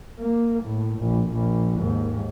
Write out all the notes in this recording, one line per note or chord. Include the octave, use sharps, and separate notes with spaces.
A#3
A2
A#1
A#1
D#2 G#2